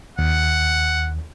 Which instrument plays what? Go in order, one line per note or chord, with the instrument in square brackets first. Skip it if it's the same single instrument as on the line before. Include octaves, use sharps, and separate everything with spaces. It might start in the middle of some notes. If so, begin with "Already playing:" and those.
[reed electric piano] D#2 [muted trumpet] F#5